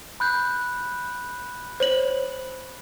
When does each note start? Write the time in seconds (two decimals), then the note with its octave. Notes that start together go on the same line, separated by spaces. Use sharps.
0.20 B5 F#6 G6
1.80 C5 C#5 F#7